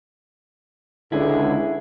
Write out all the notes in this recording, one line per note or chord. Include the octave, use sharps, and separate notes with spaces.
C#2 D3 E4 G#4